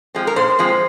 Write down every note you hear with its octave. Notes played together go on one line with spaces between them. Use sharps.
F3 G#3 C4
A#4
A#2 C5
F3 G#3 C4